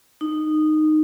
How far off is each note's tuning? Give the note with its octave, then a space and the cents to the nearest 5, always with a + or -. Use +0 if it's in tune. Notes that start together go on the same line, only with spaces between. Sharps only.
D#4 -10